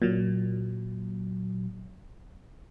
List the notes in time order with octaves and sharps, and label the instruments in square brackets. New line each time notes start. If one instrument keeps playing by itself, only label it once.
[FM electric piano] A#2 F#3